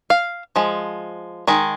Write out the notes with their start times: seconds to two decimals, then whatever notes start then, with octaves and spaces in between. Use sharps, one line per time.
0.10 F5
0.56 F3 G#3
1.47 D#3 G#3